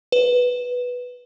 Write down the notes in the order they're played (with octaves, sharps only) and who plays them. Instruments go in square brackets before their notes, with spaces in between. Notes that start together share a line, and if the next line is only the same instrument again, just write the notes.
[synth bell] B4